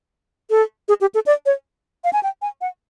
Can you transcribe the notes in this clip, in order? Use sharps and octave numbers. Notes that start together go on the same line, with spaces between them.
A4
G#4
G4
A4
D5
C#5
F5
G#5
G5
G#5
F#5